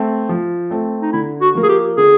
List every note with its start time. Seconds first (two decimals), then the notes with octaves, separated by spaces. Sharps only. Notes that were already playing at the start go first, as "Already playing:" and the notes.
Already playing: A3 C4
0.29 F3
0.70 A3 C4
1.02 D#4
1.13 D3 E4
1.41 F#4
1.55 F3 A#3
1.63 G#4
1.69 G4
1.97 D3 G#4